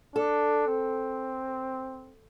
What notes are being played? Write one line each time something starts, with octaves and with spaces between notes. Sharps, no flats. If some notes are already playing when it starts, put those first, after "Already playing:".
D4 A4
C4